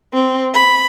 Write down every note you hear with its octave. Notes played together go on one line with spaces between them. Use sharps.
C4
B5